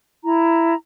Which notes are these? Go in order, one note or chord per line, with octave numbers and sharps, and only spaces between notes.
E4 A#5